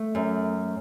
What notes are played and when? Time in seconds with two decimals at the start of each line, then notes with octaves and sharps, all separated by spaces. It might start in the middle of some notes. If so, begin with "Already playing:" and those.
Already playing: A3
0.15 F#2